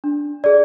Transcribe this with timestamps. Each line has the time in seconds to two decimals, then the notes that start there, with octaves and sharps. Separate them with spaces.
0.04 D4
0.44 G#4 D5